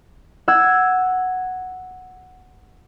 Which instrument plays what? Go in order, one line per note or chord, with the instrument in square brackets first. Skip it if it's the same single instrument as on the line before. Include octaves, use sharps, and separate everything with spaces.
[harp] F#5 E6 G#6